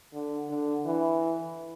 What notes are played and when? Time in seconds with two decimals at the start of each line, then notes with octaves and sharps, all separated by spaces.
0.14 D3
0.50 D3
0.86 E3